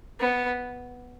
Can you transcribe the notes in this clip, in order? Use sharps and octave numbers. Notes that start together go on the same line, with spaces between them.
B3